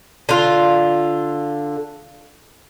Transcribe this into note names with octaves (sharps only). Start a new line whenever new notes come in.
D3 F4